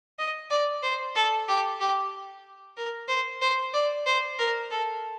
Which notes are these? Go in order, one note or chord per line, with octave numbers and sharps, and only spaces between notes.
D#5
D5
C5
A4
G4
G4
A#4
C5
C5
D5
C5
A#4
A4